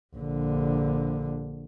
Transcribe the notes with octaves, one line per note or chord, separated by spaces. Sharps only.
A#1 D3